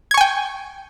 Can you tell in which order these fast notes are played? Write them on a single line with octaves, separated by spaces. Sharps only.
G#6 C#6 G#5 G5